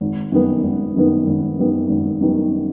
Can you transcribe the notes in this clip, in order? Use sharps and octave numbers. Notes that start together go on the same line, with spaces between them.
G#1
F#2 D#3 G3 B3
G#1
F#2 D#3 G3 B3
G#1
F#2 D#3 G3 B3
G#1
F#2 D#3 G3 B3